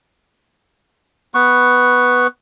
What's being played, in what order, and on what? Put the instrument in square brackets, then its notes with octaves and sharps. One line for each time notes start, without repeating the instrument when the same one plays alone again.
[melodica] B3 B4 C#6